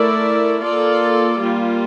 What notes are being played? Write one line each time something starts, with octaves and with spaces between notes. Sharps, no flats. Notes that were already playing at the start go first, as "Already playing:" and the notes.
Already playing: A3 E4 A#4 D5
A#3 F4 A4 D5
G3 A#3 F4